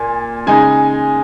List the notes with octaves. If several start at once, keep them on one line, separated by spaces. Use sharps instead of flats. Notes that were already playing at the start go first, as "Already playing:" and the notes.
Already playing: A#2 G#5
C#3 G#3 D#4 G#5